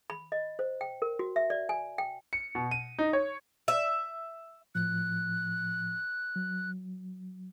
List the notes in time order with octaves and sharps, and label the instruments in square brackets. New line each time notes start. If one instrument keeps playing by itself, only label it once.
[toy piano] B5
D#5
C5
G5
A#4
F#4
E5
D5
G#5
G5
[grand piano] C#7
B2
D#7
D#4
C#5
[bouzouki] E5
[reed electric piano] A2 F3 [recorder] F#6
[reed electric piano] F#3